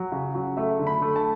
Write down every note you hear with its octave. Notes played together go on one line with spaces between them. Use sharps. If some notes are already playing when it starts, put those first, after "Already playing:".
Already playing: F#3
C#3
F#3
A3 E5
D3
B5
A3
A5